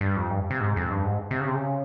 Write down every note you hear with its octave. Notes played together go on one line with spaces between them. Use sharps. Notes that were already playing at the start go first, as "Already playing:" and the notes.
G2
F2
G2
C3
G#2
F2
G2
G#2
C3
C#3
C3
C#3